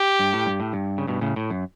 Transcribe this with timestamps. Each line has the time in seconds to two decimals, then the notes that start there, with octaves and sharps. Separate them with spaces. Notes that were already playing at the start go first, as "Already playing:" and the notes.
Already playing: G4
0.20 G2
0.33 A2
0.46 G2
0.60 A2
0.73 G2
0.98 C#3
1.07 G2 B2
1.21 A2 C#3
1.36 A2
1.50 F#2